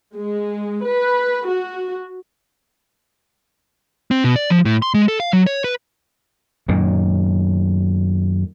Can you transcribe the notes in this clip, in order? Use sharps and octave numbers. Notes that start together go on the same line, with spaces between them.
G#3
B4
F#4
C4
B2
D5
F3
A2
C6
G#3
A4
F5
F#3
C#5
B4
F#2 A#2 D#3